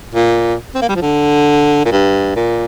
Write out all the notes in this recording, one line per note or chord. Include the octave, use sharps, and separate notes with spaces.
A#2
C4
A#3
G3
F3
D3
A#2
G2
A#2